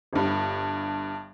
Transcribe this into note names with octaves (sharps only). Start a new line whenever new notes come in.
G1 G2